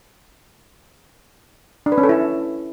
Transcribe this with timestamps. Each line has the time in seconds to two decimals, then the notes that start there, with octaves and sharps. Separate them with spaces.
1.86 D4
1.92 B4
1.98 C#4
2.03 A4
2.09 E4